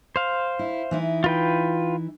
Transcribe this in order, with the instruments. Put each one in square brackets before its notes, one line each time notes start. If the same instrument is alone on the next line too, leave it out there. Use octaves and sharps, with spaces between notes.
[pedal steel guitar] C5 F5
[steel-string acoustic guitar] E4
E3 D#4 E4
[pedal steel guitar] F4 B4 G5